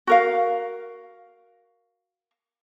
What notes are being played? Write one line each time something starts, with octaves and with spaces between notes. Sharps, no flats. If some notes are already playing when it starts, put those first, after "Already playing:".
F#4 A#4 F5